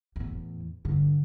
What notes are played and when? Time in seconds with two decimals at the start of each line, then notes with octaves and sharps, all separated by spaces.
0.16 E2 A2
0.85 G2 D3